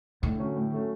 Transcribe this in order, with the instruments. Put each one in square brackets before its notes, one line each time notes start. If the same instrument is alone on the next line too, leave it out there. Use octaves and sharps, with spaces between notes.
[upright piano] A2 [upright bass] D3
[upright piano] F#3 A3 C#4
A2
F#3 A3 C#4